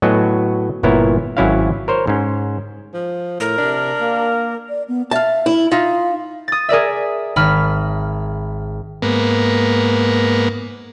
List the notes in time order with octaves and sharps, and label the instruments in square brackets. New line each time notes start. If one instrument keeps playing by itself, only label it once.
[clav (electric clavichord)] A2 F#3 B3 F#4 D#5 G#5
G1 A#2 B3 E4 A#4 C#5
G#1 F#3 C#4 E4 C#5 F5
A#4 C5 C#5
G#2 C#4
[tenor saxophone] F3
[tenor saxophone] A2 [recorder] A#4
[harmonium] C3 [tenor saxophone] D4
[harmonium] A#3
[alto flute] D5
B3
[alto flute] E5 [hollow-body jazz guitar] F5 A5
[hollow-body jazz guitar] E4
[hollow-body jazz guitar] D#4 F4 E5 [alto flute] F5
[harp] D#6 A6
G#4 A#4 D5 E5
G#1 B5 F6
[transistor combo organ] G#2 A#3 B3